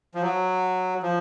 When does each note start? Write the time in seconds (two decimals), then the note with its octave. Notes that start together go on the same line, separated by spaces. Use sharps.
0.15 F3
0.22 F#3
1.03 F3